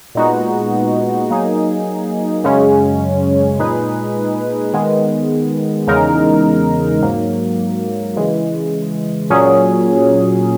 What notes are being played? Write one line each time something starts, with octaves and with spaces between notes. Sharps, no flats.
A#2 G#3 B3 D#4 F#4
F#3 A#3 D#4 G#4
F#2 C#3 G#3 C#4
A#2 G#3 D#4 G#4 B4
D#3 G#3 B3
E2 C#3 G#3 D#4 A#4
G#2 F#3 A#3
C#3 E3 G#3
A#2 F#3 C#4 G#4